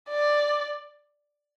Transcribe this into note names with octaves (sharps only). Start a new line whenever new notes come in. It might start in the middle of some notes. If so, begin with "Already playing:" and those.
D5